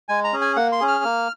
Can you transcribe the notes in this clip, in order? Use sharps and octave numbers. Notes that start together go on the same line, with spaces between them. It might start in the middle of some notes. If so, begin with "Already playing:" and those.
G#3 G#5
A#5
C#4 G#4
G#5
A#3 F#5
C6
C#4 G#4
F6
A#3